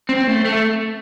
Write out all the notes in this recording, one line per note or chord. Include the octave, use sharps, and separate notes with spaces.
C4
A3
A3